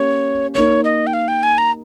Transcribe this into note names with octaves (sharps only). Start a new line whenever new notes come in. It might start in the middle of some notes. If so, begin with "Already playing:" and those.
Already playing: A#3 C#4 G4 C#5
A#3 D#4 A#4 C#5
D#5
G5
F5
G5
G#5
A#5